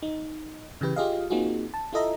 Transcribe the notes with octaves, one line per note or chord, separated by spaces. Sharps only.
D#4
C#3 E3 G4 B4
F4 G4 G#4 D#5 F5
A#3 C4 D#4 F4 F#4 G#4
A5
E4 F4 A4 D#5 E5 A#5